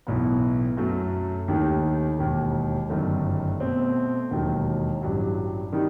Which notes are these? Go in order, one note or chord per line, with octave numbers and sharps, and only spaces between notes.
B1 A2 E3 B3
F#2 F#3 A3
D#2 D#3 A3 D#4 G4
E1 D#2 D#3
G1 F#2 D#3 A3
B2 A3 C4
E1 D#2 D#3 F#3
A1 G2 F#3
D#3 G3 D#4